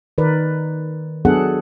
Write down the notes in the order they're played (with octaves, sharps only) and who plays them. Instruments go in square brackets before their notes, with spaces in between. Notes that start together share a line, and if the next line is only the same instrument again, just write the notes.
[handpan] D#3 A#4 B4 D5
F#3 B3 D4 G#4 A4 F#5